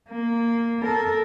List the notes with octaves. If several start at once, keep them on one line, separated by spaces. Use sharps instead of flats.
A#3
A4 A#4